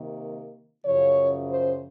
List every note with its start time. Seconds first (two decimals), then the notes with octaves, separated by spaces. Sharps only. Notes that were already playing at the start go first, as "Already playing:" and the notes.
Already playing: C3 D#3 A#3
0.84 F#2 C#3 F3 C#5
1.48 C5